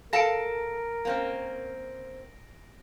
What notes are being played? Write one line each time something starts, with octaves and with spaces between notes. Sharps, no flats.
A4 A#4 F5 A5 A#6 D7
A#3 C4 C#4